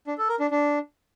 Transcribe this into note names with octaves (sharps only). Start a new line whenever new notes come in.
D4
A4
A#4
D4
D4